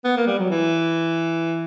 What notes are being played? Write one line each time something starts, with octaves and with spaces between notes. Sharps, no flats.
B3
A#3
G3
F#3
E3